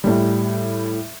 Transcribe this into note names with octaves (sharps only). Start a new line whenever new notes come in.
A2 G3